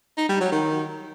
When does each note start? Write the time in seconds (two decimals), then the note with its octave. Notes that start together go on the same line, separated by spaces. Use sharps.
0.18 D#4
0.29 G3
0.40 F#3
0.52 D#3